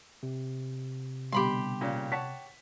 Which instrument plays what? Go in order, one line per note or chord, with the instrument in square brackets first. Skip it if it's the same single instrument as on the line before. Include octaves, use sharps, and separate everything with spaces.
[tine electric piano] C3
[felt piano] B2 D3 G3 [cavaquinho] G4 B5 C6
[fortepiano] A#2 C#3
[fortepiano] C#5 F#5 A5 [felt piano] B6